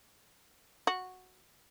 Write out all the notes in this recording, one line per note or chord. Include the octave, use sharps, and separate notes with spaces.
F#4